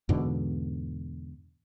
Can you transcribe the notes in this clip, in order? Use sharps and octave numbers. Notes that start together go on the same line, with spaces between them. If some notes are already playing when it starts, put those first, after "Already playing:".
E2 G#2 B2 D3